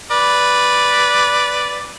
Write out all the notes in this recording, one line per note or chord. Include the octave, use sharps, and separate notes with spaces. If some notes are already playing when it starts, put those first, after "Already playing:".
B4 D5